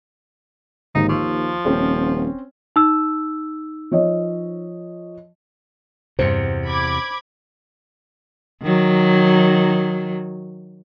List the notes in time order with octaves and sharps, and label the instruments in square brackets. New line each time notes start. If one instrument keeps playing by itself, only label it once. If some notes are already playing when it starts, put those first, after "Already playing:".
[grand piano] G#1 G#2 [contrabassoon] D#2 [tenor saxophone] D#4
[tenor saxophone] F3 [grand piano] C#6 E6
[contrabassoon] D#1 [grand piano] C4 C#4
[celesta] D#4 E6
[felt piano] F3 C#5 D#5
[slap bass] E2 C3 [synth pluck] G2 C#7 [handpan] C5
[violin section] B5 D6 G#6
[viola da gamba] D#3 F#3